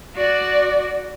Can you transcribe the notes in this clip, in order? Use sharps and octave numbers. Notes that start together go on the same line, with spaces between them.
F#4 D5